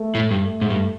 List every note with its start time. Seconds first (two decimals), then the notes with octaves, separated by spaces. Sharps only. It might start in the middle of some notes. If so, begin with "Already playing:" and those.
Already playing: A3
0.15 A2
0.31 G2
0.45 A3
0.61 G#2
0.70 G2